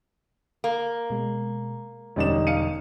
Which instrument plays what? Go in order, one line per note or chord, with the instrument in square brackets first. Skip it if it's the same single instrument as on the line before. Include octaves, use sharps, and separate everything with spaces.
[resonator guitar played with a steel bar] A#3
[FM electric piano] B2 G#3
[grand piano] E1 G3 D#4 [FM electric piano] D3 [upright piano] C#4 D5 E7
[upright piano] F5 C#7 D#7